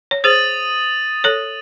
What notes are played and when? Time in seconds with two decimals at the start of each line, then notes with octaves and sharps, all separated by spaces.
0.11 C#5
0.24 G#4 C5 D#6 A6 D#7 F#7
1.24 A4 C#5